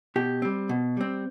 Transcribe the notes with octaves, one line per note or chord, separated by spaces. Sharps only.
B2 G4
G3 C4
B2
G3 C4